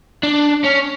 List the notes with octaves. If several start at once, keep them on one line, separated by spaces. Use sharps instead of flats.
D4
C#4